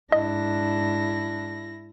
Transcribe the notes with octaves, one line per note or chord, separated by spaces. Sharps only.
G#2 D4 E4 D#5 A#6